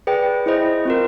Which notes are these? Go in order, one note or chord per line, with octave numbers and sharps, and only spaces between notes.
G#4 B4 D5 G5
E4 G#4 C5 D#5
C4 F4 A#4